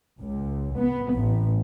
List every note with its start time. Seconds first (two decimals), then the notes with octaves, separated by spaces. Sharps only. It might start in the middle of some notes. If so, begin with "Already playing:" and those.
0.20 C#2
0.77 B3
1.14 A1